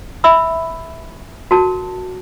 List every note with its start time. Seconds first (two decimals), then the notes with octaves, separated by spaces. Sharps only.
0.24 E5 B5 E6
1.51 F#4 A#4 A5